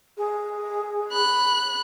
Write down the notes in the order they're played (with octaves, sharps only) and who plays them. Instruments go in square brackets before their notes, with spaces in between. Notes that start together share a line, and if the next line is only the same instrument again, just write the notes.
[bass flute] G#4
[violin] B5 F#6